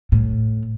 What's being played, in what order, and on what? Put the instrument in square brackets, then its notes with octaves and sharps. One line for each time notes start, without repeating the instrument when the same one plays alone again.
[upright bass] A2